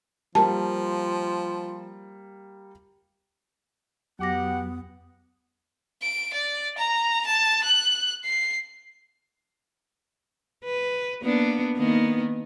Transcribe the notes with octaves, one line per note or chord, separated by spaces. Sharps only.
F3 G3 A#3 A5
F2 F#3 B3 G4 F#5 D6 A#6
D7
D5
A#5
A5
F#6
C7
B4
A#3 B3 D4
D#3 A#3 B3